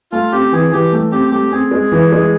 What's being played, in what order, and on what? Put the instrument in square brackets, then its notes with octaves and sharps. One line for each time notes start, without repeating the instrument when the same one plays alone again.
[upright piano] A3 [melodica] F4
[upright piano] C4 [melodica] G4
[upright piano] E3 [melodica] G#4
[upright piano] E3 [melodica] G4
[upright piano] A3
[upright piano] C4 [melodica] G4
[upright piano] A3 [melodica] G4
[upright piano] C4 [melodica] G#4
[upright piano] G#3
E3
G#3